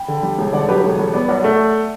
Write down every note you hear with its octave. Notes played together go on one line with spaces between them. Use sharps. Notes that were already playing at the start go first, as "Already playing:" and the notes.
Already playing: G5 B5
D3
G3
E1
D3 D5 F#5
F#3 G4 B4
E1 A4 C#5
G3 A4 C#5
B3 B4 D5
B1 D5 F#5
A3